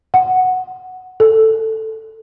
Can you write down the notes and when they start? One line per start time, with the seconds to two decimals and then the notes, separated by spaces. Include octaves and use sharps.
0.14 F#5
1.20 A4